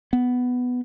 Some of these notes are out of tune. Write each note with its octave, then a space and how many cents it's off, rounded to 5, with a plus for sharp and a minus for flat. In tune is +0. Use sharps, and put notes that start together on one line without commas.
B3 +5